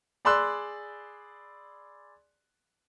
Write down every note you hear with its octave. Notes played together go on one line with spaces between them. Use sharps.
G#4 D5 B5 C6 E6 F#6